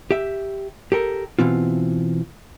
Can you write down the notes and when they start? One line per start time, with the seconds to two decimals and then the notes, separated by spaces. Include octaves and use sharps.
0.11 G4 E5
0.92 G4 A4 A#4
1.39 B2 E3 C4 F4